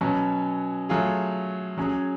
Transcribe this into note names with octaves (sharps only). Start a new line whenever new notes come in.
B2 F#3 C#4
F#3 A3 F4 G#4
F#3 C#4 G#4